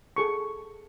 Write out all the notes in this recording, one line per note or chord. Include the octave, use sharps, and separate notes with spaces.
G#4 A4 C#6